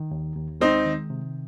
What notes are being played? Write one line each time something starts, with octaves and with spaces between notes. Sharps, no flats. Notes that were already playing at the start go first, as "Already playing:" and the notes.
Already playing: D#3
D#2
D#2
G#3 C4 D#4
D#3
C3